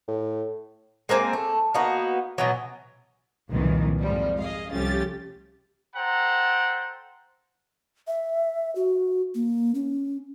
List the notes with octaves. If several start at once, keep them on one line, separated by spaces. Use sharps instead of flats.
A2
G#3 A#3 C4 G#5
A3
A#3 B3 D#4 F#4
B2 E3 F#3
C2 F2 A#2 D#3 E3 F#3
F2 G#2 F3 G3
G#4 D#5 F5
C2 F3 A3 C#4 G4 A6
A4 C5 F#5 G5 A#5
E5
F#4
A#3
C#4